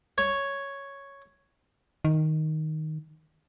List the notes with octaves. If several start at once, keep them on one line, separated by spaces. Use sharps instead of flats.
C#5
D#3